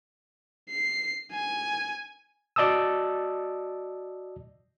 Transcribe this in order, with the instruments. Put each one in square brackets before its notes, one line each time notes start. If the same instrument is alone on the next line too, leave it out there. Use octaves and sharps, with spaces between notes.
[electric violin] C7
G#5
[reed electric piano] F#4 D5 D#5 A5 D#6 E6